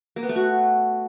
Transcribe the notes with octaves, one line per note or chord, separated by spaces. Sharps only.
A#3
B3
A3
F#4